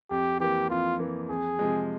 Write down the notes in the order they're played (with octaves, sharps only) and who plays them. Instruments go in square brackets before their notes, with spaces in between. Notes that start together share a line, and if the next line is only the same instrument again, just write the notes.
[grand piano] F2 [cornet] G4
[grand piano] E3 A#3 [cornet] G4
[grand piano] F2 [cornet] F4
[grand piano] E3 A#3
[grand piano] F2 [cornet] G#4
[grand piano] C3 F3 G#3